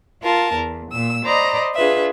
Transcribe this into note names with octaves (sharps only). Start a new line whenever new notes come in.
F4 A#4 A5
E2
A#2 E6
C5 D5 D#5 A#5 B5
D4 F4 G#4 B4 E5